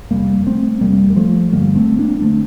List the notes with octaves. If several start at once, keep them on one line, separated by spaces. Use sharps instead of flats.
F2 C3 G3 A#3
A3 C4
F2 C3 G3 A#3
A#3
F3 A3
G2 D3 G3 A#3
A3 C4
A#3 D4
D3 A3 C4